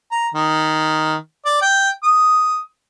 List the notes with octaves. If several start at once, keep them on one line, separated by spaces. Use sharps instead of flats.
A#5
D#3
D5
G5
D#6